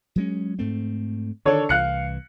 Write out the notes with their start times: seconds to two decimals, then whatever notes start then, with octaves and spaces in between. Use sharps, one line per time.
0.16 F#3 G#3 C#4
0.59 G#2 A3 C4
1.45 D3 D#3 D4 A4 C#5
1.69 C2 E3 F5 F#6 C#7